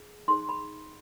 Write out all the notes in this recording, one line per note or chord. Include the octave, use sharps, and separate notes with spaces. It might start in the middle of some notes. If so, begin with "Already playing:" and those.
Already playing: G#4
D#4 G#4 C5 C6
B5